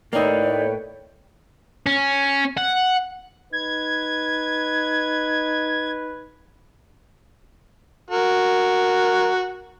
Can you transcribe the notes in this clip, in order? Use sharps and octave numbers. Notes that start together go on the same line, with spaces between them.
A2 A#3 D#4 B4 C#5 D5 G5
C#4
F#5
D#4 B4 G#6
F#4 A#4